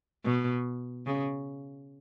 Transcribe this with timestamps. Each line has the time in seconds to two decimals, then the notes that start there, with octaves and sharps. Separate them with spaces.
0.24 B2
1.06 C#3